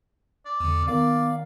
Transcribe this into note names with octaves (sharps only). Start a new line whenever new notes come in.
D5
E2 D3
D#3 B3 A#4 D5 F5